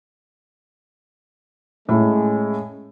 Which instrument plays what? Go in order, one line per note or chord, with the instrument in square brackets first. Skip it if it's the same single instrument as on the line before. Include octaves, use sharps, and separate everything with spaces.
[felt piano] A2 [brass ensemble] G#3 C#4